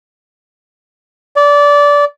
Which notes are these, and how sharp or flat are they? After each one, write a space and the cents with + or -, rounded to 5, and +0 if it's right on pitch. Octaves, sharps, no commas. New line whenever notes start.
D5 -20